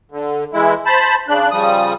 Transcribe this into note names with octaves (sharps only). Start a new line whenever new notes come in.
D3
E3 G#3 E4
C5 A5 B5
C#3 D4 F#6
C#3 F3 G3 D#6